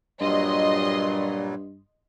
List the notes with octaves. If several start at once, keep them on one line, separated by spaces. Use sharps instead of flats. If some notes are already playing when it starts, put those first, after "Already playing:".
G2 A#2 F#3 G3 D#5 C6